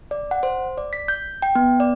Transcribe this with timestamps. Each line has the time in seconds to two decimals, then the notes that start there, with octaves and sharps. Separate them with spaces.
0.11 D5
0.31 F#5
0.43 C5
0.78 D5
0.93 B6
1.08 G6
1.42 G5
1.55 B3
1.80 D5